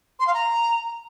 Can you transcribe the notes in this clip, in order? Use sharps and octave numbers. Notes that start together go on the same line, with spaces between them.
C6
F5
A#5